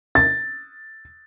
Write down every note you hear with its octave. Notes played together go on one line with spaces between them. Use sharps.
A6